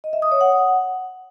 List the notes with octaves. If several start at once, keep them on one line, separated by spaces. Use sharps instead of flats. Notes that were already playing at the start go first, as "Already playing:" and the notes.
D#5
E5
D#6
C#5
F#5